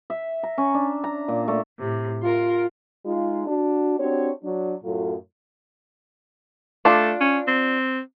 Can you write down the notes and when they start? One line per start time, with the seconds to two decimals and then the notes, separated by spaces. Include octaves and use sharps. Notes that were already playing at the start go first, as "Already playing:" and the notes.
0.10 E5
0.43 A#5
0.58 C#4
0.74 D4
1.04 A#5
1.28 A#2
1.48 A3
1.78 A2 C3
2.22 F4 A#4 C6
3.05 G#3 D#4 F4
3.47 D4 F#4
3.98 C4 D4 F#4 G4 C#5
4.43 F#3 D4
4.83 F#2 A2 F#3 F4 A4
6.85 A3 D4 F4
7.21 C#4
7.47 C4